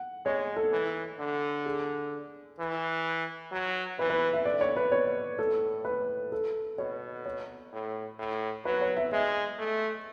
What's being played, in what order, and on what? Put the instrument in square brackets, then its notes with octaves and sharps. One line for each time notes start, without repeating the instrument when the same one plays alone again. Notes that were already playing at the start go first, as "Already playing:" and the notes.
Already playing: [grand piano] F#5
[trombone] G#3 [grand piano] C#5
[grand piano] A4
[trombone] E3
D3
[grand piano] G#4
[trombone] E3
F#3
[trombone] E3 [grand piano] B4
[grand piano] B4
E5
[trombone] D3 [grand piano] D5
[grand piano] C#5
B4
[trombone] B2 [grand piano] C#5
[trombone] A2 [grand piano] A4
[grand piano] B4
A4
[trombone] B2 [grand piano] C#5
[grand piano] C#5
[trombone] A2
A2
[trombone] F#3 [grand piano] B4
[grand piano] C#5
E5
[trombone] G#3 [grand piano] E5
[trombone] A3